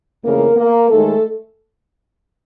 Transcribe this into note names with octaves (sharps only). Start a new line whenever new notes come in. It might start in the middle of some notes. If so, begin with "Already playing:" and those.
F2 C#3 E3 A3 A#3 A#4
A#3 A#4
D#2 D#3 G#3 A3 A4